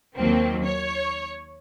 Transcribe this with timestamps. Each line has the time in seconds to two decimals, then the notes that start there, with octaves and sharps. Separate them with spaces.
0.17 D#2 D#3 F#3 A#3 C4
0.64 C#5